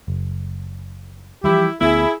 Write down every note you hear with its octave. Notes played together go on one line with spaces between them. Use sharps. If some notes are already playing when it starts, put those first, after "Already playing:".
F#1
E3 F3 G3 E4 G4
D2 B3 E4 G#4